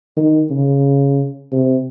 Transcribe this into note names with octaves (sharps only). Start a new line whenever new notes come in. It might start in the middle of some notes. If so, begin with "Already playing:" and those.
D#3
C#3
C3